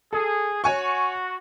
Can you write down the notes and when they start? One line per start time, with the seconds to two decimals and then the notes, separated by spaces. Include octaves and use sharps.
0.13 G#4 A4
0.64 F#4 C#5 G#5 C#6